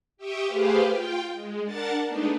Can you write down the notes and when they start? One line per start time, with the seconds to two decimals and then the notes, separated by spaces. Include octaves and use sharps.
0.17 G4 E5 G5 C#6 D#6
0.46 A3 G4 G#4 B4 C5 F5
0.84 F4 G5
1.33 G#3
1.65 D4 A#4 F#5 A5 A6
2.05 G#3 A3 B3 D4 D#4